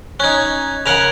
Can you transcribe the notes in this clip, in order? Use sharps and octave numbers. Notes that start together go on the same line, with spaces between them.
C#4 D#4 F#6 G#6
C#3 A#4 F#5 F#6 G#6 F7